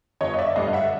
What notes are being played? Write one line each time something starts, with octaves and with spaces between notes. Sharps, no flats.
G1 C#5 D#5
D#5
D5 E5
G2 D3 D#5 F5
E5 F#5